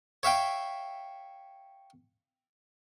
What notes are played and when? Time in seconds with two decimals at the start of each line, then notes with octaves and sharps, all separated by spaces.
0.23 C#5 E5 F5 G5